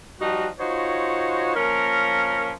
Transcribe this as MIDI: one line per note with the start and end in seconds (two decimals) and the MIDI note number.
0.20 0.47 53
0.20 0.47 55
0.20 0.47 63
0.20 0.47 66
0.59 1.53 63
0.59 1.53 65
0.59 1.53 66
0.59 1.53 72
0.59 1.53 73
1.56 2.51 53
1.56 2.51 58
1.56 2.51 61
1.56 2.51 70